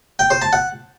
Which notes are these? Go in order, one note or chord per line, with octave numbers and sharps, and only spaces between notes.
G5
C5
A5
F#5